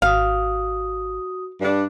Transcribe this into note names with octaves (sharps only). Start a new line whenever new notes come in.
G#1 F#4 F5 D#6
G2 D4